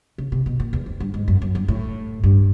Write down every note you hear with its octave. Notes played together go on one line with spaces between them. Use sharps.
C#3
C3
B2
A#2
E2
F2
G2
G#2
F#2
F#2
G2
A2
G2